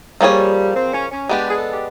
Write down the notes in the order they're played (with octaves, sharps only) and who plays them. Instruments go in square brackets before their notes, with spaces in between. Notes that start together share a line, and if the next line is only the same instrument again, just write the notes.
[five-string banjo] F3 A#3 D#4 G#4 C#5 [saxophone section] G3
[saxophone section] C4
C#4
C#4
[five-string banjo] G#3 B3 D4 [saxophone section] G4
[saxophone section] G#4
A4
G4